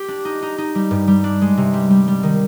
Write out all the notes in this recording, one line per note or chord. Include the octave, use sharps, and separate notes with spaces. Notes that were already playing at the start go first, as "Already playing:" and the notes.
Already playing: G4
D4
D#4
D#4
D#4
G3
G2
G3
D4
G#3
C3
G3
G3
G3
D#3